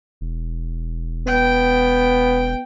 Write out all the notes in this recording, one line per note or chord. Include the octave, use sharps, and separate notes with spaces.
E1
B3 G5